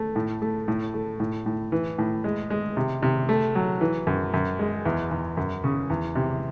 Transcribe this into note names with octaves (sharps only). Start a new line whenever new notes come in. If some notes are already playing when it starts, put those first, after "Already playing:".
Already playing: A3
A2
A3
A2
A3
A2
A2
E3
A2
G#3
G#3
C3
C3
A3
F#3
E3
F#2
F#2
G#3
E2
E2
F#2
C#3
E2
C3